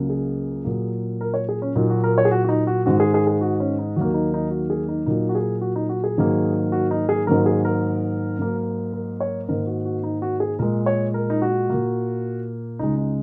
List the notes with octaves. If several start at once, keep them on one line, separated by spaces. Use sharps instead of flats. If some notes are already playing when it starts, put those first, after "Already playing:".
Already playing: C#2 C#3 F#3 A#3
G#4
A#2 F#3 A#3
A#4
C#5
G#4
C#4
A#2 F#3 A#3 D#4
F#4
A#4
C#5
G#4
F#4
F#4
D#4
F#4
G#2 D#3 G#3 F#4
G#4
G#4
G#4
F#4
C#4
D#4
D#2 D#3 F#3 A#3 F#4
D#4
D#4
F#4
G#4
D#4
A#2 F#3 A#3 D#4
F#4
G#4
F#4
D#4
F#4
G#4
G#2 D#3 F#3 A#3
F#4
D#4
G#4
G#2 D#3 F#3 A#3 A#4
G#4
A#4
G#2 F#3 A#3
A#4
C#5
G#2 D#3 A#3 A#4
F#4
F#4
D#4
F#4
G#4
A#2 G#3 A#4
C#5
A#4
D#4
F#4
A#2 A#3
C#2 C#3 G#3 D#4
D#4